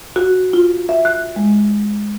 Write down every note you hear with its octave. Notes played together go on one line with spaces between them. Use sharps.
F#4
F4
E5
F#6
G#3